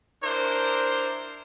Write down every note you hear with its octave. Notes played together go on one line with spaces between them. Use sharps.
D4 E4 A#4 C5